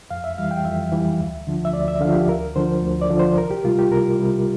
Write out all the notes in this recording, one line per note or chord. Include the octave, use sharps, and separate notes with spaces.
F2 F5
E5
E3 G3 F5
G5
F2 E5
E3 G3
D2
D3 F3
E5
D2 D5
E5
D3 F3 F5
G4
D2 A#4
D3 F3 C5
D2
D5
D3 F3
C5
C2 A#4
G4
C3 G3 F4
G4
C2 A#4
C3 G3